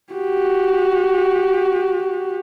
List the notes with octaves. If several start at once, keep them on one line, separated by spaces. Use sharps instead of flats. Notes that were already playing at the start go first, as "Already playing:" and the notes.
F#4 G4